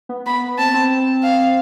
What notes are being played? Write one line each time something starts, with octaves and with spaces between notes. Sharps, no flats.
B3
B3 B5
C4 A5
C4
F5